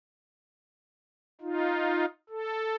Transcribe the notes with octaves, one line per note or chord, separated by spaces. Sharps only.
D#4 F4
A4